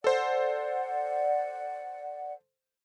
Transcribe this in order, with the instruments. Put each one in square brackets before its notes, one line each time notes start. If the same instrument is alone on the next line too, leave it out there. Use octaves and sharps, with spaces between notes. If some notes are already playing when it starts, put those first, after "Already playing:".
[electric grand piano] A4 C5 [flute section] D5 F#5